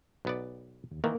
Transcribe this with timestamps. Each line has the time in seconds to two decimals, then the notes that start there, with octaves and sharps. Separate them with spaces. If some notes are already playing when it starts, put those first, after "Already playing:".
0.25 B1 B3 D5
0.91 D#2
1.04 D#3 E3 A#3 A#4